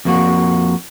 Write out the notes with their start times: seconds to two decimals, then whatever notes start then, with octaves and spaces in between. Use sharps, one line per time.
0.05 F2 A#3 F#4